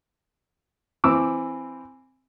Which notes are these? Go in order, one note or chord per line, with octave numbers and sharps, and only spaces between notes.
E3 C4 D6 E6